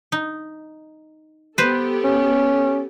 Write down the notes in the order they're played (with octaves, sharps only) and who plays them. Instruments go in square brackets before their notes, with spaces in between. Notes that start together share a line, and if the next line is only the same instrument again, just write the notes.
[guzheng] D#4
[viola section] B3 G4 A4 [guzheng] B4 C5
[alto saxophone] C#4